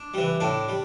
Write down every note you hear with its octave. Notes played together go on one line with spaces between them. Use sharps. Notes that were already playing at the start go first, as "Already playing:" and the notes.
Already playing: D4
E3 G3
A2 D4
G3